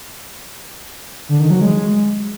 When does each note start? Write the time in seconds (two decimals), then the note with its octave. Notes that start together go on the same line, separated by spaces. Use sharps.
1.29 D3
1.40 D#3
1.50 F#3
1.61 G#3